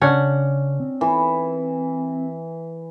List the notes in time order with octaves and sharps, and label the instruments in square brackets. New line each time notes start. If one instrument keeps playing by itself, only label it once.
[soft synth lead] C#3 [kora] C#4 D4 F#5
[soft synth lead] C4
[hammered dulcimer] E3